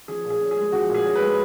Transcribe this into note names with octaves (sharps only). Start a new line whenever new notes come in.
F3 G#4
A#2
G#4
C#4
G#4
G#3
F3 F#4
A#2
G#4
C#4
B4
G#3